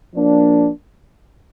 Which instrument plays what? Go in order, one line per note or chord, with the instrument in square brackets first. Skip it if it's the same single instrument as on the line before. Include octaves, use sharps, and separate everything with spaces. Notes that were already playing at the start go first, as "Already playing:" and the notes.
[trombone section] F3 A#3 D4